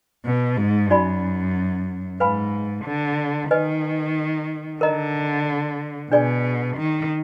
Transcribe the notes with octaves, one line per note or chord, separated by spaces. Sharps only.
B2
G#2
F#2 D#4 F#4 D5 G#5 B5
G#2 B4 F5 G#5 B5
D3
D#3 B4 D#5 G#5
D3 A#4 D#5 A#5
B2 D4 G#4 D5 G#5
D#3